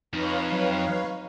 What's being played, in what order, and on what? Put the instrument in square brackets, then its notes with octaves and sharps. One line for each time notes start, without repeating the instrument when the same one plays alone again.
[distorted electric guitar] F2 [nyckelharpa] D#4 [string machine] B4 C#5 F5 [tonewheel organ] F6 A#6
[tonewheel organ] F#3